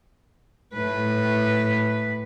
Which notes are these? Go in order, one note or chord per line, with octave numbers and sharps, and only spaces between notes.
A2 B4